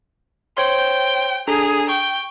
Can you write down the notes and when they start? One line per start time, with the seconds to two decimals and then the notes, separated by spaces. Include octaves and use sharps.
0.57 C5 C#5 G5 C6
1.47 D4 G#4 A4 A#5
1.89 G5 C#6